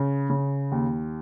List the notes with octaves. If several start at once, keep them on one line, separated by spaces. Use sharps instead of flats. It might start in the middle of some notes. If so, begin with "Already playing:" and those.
Already playing: C#3
C#3
D#2